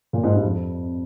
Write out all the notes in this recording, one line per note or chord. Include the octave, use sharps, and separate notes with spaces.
A#2
G#2
G2
F2